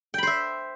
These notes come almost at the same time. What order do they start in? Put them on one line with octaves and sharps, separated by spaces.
G5 B5 C5 E5